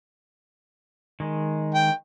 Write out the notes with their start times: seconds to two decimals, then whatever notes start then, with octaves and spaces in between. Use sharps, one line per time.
1.20 D#3 G#3
1.74 G5